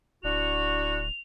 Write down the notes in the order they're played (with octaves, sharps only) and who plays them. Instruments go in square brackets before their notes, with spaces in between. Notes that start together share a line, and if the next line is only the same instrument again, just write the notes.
[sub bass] D1 [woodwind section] D4 E4 F#4 [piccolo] F7